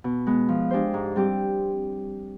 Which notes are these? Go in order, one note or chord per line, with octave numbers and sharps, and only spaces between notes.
B2
G#3 B3
F3
G#3 D4 G4 C5
G#2
G3 C4 G4